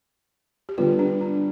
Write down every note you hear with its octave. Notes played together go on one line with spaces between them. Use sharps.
G4
D3 G3 B3 F4
D4
D4